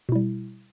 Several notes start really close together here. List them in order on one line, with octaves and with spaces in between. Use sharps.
B2 E4 G3